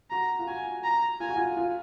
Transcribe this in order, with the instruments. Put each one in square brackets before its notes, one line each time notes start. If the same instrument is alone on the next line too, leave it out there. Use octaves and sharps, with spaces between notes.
[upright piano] F#4 [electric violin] A#5
[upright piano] F4
[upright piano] F#4 [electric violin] G#5
[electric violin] A#5
[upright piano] F4 [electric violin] G#5
[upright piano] F#4
F4
F4